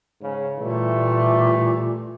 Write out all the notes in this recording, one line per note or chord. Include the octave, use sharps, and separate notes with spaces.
G#2 C#3
A#2 E3 G3 A3